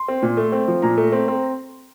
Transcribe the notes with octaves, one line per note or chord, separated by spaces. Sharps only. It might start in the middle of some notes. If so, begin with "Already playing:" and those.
Already playing: C6
C4
A#2
A3
C4
F3
A#2 A#5
A3
C4
C4